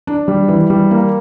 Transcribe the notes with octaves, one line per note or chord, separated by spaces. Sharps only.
D4
G3
E3
G3
A#3